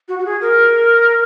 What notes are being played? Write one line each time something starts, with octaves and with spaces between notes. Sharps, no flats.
F#4
F#4
G#4
A#4